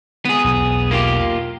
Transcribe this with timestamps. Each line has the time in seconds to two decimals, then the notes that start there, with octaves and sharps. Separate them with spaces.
0.25 B3 G#4
0.44 B1 E2
0.91 A#3 F4 G4